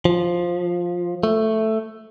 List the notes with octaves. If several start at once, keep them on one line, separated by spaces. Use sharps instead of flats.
F3
A3